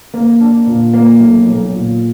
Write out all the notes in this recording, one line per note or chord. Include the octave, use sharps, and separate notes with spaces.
A#3
D4
A#2
A#3
B1
B1
A#2